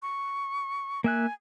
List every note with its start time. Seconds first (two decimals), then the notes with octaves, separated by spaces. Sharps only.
0.02 C#6
1.04 A#3 E5 G#5 F#6